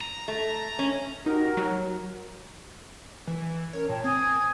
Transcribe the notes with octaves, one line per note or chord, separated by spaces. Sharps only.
A#5
A3
C#4
D#4 F#4 G4 A#4
F#3
E3
C#4 A#4 C#5
A#2 C#5 G5 A5
C4 G#5 D#6 G#6